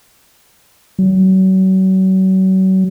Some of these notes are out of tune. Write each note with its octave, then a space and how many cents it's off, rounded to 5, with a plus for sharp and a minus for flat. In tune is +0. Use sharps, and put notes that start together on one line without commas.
F#3 +35